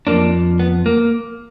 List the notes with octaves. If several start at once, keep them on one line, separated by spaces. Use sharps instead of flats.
F2 F3 A#3 D4
B3
A#3